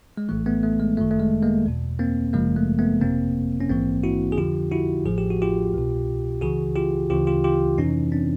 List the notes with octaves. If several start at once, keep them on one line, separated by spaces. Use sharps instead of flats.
G#3
A#1 A2 E3 A3
A3 B3
A3
G#3
G1 F#2 D#3 A3
A3
G#3
G#3 A#3
E2 B2
A#3 C4
G1 F#2 C#3 F3 G#3 A#3
A3
A3 B3
G1 F2 C3 A#3 C4
C#4
A#1 G#2 E3 A#3 C4
E4 F#4
G#4
F2 D3 F3 F4 G4
E4 F#4
A1 A2 F3 G#4
G4
F#4
F4 G4
C2 B2
C#2 C#3 E3 F#4 G#4
F4 G4
D2 C#3 E3 F4 G4
F4 G4
F4 G4
F2 C3 E3 C#4 D#4
C4 D4